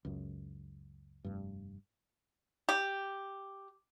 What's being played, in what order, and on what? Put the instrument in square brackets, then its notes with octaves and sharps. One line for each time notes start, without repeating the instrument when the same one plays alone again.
[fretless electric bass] C#2 F#2
F1 G2
[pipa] G4